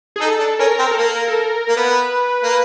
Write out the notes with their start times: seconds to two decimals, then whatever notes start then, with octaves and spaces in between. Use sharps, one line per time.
0.16 G#4
0.20 D#4 A4
0.39 D4
0.59 C#4 A#4
0.79 C4
0.91 A4
0.98 A#3 A#4
1.28 A4
1.38 A#4
1.69 A#3
1.77 B3 B4
2.43 A#3